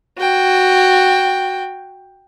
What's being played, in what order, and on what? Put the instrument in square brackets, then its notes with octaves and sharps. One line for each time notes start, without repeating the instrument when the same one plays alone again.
[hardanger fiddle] F#4 G5